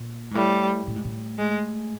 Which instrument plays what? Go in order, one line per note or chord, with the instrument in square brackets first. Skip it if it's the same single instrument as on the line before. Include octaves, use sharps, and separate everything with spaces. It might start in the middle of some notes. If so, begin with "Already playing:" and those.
Already playing: [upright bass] A#2
G#2
[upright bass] A2 [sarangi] G3
[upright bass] A2
G#2
A2
[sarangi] G#3